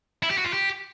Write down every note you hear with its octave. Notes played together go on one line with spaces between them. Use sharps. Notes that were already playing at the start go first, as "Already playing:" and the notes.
E4
G4
F#4
F4
G4